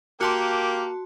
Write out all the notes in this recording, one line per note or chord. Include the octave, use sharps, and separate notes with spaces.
A#3 F#4 G4 A5 C6